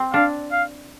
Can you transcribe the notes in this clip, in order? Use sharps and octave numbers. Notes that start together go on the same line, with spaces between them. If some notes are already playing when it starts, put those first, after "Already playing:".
Already playing: C4
D4 F5
F5